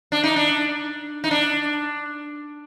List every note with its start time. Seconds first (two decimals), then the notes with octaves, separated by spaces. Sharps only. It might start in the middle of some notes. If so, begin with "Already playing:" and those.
0.12 D4
0.24 D#4
0.36 D4
1.24 D#4
1.31 D4